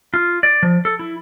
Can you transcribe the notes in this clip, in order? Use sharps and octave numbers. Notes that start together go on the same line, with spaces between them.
F4
D5
F3
A4
E4